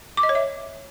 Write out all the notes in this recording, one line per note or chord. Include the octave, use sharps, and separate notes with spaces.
D6
D#5
C#5
E5